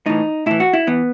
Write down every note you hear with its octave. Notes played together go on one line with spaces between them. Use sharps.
A2 E3 D#4
A2 E3 E4
F#4
E4
E3 B3